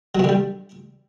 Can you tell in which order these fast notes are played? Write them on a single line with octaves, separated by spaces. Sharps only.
F#3 B2 D3 G3